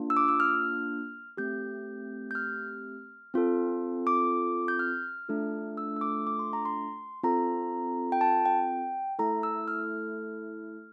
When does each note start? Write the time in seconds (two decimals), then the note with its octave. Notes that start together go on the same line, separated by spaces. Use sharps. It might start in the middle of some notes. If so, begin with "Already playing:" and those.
Already playing: A#3 D4 F4
0.10 E6
0.17 D6
0.28 E6
0.40 F6
1.37 A3 C4 G4 G6
2.31 G6
2.35 F6
3.34 C4 F4 A4
4.07 D6
4.68 G6
4.79 F6
5.29 A3 D4 F4 A4
5.77 E6
5.96 E6
6.01 D6
6.27 D6
6.39 C6
6.53 A#5
6.65 C6
7.23 C4 F4 A4 A#5
8.12 G5
8.21 A5
8.46 G5
9.19 A3 E4 A4 A#5
9.43 E6
9.68 F6